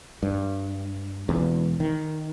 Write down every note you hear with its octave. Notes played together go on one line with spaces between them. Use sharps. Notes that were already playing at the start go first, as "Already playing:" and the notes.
G2
E1 E2
D#3